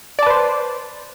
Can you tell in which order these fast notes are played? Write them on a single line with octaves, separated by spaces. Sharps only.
D5 A5 B4 C5